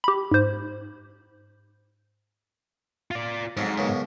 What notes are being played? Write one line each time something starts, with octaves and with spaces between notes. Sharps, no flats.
G4 B5
G#2 C5
F4 D5
F2 G#2 F#3
B1 F#2 C#3